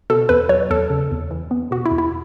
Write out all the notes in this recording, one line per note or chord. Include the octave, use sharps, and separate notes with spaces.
B2 A4
E2 B4
F#3 C#5
E2 A4
C#3
E2
E3
B3
B2 F#4
E4
E2
E4